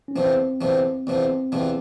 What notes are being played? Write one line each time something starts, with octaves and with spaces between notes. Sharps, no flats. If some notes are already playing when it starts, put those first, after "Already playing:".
C#4
E2 C3 F3 C4
E2 C3 F3
E2 C3 F3 C4
E2 C3 F3